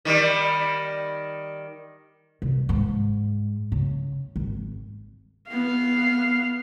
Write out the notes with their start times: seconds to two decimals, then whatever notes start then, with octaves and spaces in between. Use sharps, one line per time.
0.05 D#3 G3
2.42 C2
2.69 G#2
3.72 C#3
4.36 G#1
5.48 B3 F5